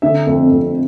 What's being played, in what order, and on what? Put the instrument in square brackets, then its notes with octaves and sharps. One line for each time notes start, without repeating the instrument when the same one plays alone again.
[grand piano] D3 E5
F2
F2